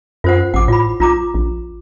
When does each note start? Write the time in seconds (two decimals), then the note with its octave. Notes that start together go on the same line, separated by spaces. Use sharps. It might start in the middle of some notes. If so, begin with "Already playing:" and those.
0.24 F#2 F4 C5 F#5
0.54 A1 F#5 D6
0.68 A2 F4 B5
1.00 B1 F4 A#5 D6
1.35 A#1